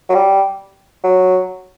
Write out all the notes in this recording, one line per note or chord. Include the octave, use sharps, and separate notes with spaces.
F#3
G3
F#3